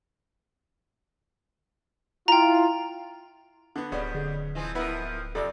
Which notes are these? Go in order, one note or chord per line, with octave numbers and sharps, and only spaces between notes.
E4 F4 G5 A#5
D3 B3
D1 F2 C#3 G3 B3 C#4
D3 G#4
E3 F3 C4 D#5 G#5 D#6
A2 F3 B3 E4 A#4 B4
F2 C3 A4 D5